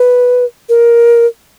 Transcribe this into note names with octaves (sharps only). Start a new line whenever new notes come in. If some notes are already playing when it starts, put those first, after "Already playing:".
Already playing: B4
A#4